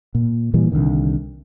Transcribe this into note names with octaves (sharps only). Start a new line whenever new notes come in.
A#2
A#2 E3 G3
C2 B2 D3 D#3